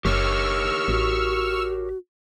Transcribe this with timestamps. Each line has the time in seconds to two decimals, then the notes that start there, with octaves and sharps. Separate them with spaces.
0.05 F#1 G4 A#4 C#5 C#6 E6 F6
0.88 A1 F#4